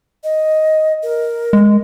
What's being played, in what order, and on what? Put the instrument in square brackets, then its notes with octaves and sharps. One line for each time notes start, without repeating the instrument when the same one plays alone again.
[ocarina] D#5
A#4
[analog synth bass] G#3